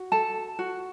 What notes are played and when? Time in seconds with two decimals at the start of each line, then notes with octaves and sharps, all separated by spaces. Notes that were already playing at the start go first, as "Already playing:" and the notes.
Already playing: F#4
0.12 A4 A5
0.59 F#4